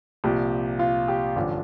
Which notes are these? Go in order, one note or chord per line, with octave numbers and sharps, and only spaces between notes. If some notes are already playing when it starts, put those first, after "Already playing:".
C2 A#2 F3 G4
F4
G4
A1 G2 D3 F3